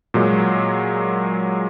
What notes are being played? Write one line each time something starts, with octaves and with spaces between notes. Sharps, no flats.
A#2 F#3 G#3